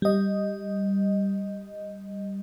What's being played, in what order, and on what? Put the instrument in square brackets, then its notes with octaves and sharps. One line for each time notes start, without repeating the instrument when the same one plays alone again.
[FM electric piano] G3 D#5